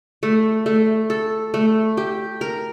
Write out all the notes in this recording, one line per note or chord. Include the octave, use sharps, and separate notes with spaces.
A3
A3
A4
A3
G4
A#4